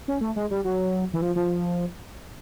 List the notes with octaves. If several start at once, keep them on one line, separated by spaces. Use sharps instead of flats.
C#4
A3
G#3
G3
F#3
E3
F3
F3